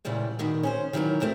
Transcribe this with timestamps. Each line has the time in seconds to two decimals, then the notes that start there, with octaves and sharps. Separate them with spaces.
0.05 A#2 C#3 E3 G3 G#3
0.39 A#2 D#3 B3 F#4
0.63 C#4 G#4 C5
0.93 D#3 E3 F#3 G3 G#4 A#4
1.20 D2 A3 C4 F#4 A#4